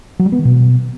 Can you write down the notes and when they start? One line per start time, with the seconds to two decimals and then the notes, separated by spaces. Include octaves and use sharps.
0.19 F#3
0.26 G3
0.32 B3
0.39 D#3
0.45 B2